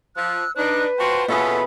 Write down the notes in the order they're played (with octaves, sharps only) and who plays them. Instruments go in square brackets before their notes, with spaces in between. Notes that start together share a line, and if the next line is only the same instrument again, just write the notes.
[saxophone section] F3 [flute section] E6 F#6
[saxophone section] D4 [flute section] D#4 F#6 [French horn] B4
[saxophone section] F4 F#4 C5 [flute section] G5 A5 C6
[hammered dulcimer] B2 G#4 [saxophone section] B3 C#4 A4 [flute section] F4 E5 B5